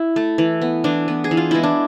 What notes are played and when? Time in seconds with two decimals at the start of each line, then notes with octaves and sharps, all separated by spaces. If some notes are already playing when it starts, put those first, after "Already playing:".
Already playing: E4
0.16 A3
0.38 E3
0.62 B3
0.84 E3 D4
1.08 B3
1.24 G#4
1.31 E3
1.37 F4
1.51 G#3 B3 E4
1.63 D4